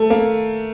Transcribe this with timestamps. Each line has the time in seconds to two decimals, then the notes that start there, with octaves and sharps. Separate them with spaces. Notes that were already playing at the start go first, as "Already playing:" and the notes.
Already playing: A3
0.10 A#3